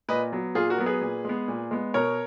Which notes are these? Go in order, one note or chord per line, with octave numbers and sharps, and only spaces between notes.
A#2 B4 D#5
F#3 B3
A#2 F4 G#4
F#4 A#4
F#3 B3
G#4 B4
A#2
G#3 B3
A#2
G#3 B3
B2 A#4 C#5